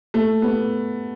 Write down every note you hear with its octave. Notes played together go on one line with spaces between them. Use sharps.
A3
B3